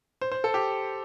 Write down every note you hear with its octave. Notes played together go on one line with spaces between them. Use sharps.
C5
C5
A4
G4